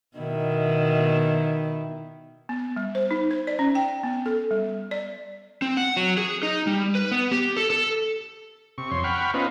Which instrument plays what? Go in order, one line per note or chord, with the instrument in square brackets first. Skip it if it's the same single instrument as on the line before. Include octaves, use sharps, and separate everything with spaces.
[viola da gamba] B2 D#3 E4
[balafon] B3
G3
C5
D#4
C5
D5
C#4
G5
B3
A4
G3
D5
[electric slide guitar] C4
F#5
F#3
G#4
D#4
G3
B4
B3
G4
A4
A4
[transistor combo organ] C3 C#6
F2 C#5 C6
F#5 G5 B5 C#6 F6
B3 C#4 D#4 F4 B4 C5